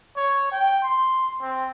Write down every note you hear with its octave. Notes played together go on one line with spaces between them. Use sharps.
C#5
G5
C6
C4